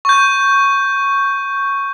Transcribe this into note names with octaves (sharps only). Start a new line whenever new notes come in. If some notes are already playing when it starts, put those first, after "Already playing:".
C#6 G6